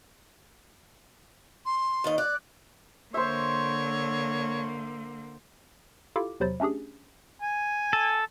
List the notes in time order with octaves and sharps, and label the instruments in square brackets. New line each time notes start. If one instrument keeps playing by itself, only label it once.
[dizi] C6
[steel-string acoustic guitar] D#2 D#3 D#5
[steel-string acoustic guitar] D5 [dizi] F#6
[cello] D3 A#3 [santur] C5 E5 [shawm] C#5
[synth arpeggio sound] E4 F4 G4 A4 F5 D6
E2 C3 F#3 C5 B5 A6
A3 C#4 D4 G4 G#4
[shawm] G#5
[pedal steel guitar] A4